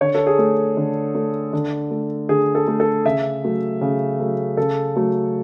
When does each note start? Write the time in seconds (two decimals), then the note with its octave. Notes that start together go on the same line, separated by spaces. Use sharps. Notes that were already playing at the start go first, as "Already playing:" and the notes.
0.01 D3 C#5
0.15 A4
0.27 G#4
0.39 A3
0.77 D3
1.15 A3
1.53 D3
1.91 A3
2.29 D3 G#4
2.55 A4
2.68 A3
2.80 A4
3.05 C#3 E5
3.44 F#3 A3
3.81 C#3
4.19 F#3 A3
4.57 C#3 A4
4.96 F#3 A3